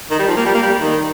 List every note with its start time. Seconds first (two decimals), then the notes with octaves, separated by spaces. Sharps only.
0.11 D#3
0.19 G3
0.28 F3
0.37 A#3
0.45 G3
0.54 A#3
0.63 G3
0.81 D#3